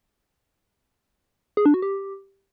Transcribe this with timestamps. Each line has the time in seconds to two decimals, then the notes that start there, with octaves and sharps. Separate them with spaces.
1.57 G#4
1.66 D4
1.74 F#4
1.82 G4